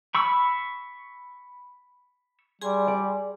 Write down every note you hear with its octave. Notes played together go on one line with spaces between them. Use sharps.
B5 C#6 E6
G3 G#4 G#5 C6
D5